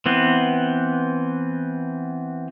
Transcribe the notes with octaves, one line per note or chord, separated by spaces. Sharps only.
E3 B3 C4